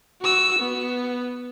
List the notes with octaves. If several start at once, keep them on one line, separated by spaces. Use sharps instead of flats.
F#4 E6
B3